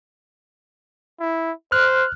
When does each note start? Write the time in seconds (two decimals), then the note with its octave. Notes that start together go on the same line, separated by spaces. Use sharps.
1.20 E4
1.72 C5 F6 F#6